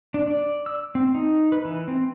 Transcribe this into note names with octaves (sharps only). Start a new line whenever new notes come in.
D4
D5
E6
C4
D#4
B4
E3
C4